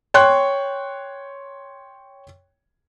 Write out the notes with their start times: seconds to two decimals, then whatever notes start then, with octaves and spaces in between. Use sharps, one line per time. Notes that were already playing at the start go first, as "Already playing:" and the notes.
0.14 C#5 G5 C6 C#6 F#6